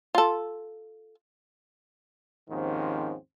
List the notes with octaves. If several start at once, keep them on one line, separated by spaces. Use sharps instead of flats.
F4 A4
D#2 G#2 D#3 F3 C4 C#4